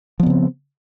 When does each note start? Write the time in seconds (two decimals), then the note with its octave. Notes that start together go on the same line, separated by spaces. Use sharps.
0.20 F3
0.23 B3
0.26 C#3
0.30 C4